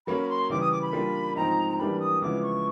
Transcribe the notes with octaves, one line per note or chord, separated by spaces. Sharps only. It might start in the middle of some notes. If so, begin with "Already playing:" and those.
F#3 A#3 C#4 B5
C6
C#3 E3 G3 D6
D#6
D6
B5
G3 A#3 D4 F4
G#2 F3 G#3 C4 D#4 A#5
A#5
E3 G3 A#3 D4 G4 B5
D#6
C#3 F3 G#3 B3 E4 D6
C#6